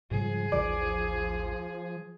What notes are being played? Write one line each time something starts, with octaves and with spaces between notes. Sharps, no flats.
G#2 C#3 F3 G3 G#4
A1 D#2 F3 D5